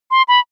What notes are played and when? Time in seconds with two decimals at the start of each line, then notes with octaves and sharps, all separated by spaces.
0.11 C6
0.28 B5